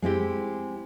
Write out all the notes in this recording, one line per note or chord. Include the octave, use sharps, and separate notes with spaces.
G#3 C4 E4 G4